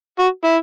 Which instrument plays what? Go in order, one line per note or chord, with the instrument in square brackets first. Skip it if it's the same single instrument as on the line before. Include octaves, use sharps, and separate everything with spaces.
[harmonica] F#4
E4